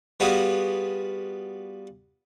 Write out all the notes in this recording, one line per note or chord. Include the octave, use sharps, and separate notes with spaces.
G3 B3 F4 F#4 G#4